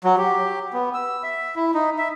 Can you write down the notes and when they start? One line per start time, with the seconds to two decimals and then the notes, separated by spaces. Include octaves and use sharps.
0.04 F#3
0.18 G4
0.73 B3
0.94 E6
1.23 E5
1.56 E4
1.74 D#4
1.98 E5